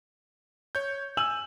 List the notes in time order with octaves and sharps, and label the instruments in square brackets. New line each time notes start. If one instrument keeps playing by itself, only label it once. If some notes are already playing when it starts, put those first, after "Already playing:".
[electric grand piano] C#5 G6
[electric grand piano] G#5 [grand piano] E6 F#7